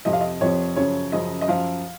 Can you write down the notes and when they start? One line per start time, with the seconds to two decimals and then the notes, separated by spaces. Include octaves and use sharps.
0.05 F2 C3 F3 D#5
0.13 F5
0.21 D#5
0.41 F2 C3 F3 C#5
0.76 F#2 C#3 F3 C#5
1.12 F#2 C#3 F3 D#5
1.41 D#5
1.48 F#2 F3 F5